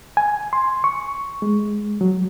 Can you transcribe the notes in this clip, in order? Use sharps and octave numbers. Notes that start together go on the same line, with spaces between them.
G#5
C6
C#6
G#3
F#3